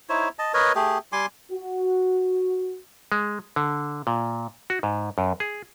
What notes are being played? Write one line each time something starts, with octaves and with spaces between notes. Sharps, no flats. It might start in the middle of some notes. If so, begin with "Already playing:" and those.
D#4 E4 C5 C#5
D#5 A5
A#4 B4 C#5 D#5
A3 G4 G#4
G3 G#5 C6 D6
F#4
G#3
D3
A#2
F#4
G#2
F#2
G#4